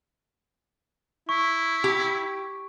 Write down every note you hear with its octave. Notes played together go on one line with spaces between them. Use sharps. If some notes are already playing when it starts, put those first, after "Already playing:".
E4 C#6
G4